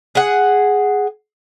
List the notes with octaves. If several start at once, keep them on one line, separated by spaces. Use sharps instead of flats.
G#4 F#5